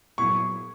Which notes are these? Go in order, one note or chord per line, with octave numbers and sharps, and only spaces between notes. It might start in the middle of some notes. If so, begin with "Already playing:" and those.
A#2 F#3 B3 E4 G#4 C#6